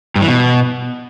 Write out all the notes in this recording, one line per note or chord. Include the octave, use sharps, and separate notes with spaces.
G2
E3
B2